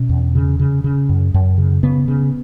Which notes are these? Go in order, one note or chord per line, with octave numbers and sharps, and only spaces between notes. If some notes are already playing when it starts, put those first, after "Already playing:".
Already playing: B2 C#4
E2
C#3
C#3
C#3
F#2
F#2
C#3
C#3 B3
C#3